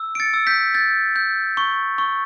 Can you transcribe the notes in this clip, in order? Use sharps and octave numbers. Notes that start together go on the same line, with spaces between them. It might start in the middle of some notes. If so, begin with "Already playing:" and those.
Already playing: E6
D7
A6 C#7
E6
G6 B6
G6 A6
G6
C#6
C#6